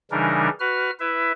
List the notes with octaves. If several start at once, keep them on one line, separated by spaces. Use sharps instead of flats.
C#3 E3 G3 D4 D#4 A#4
F#4 B4 F6
E4 B4 E5